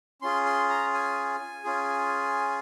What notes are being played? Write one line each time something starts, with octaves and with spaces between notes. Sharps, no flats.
C#4 F4 G#4 C6
C6
A#5
G#5
C#4 F4 G#4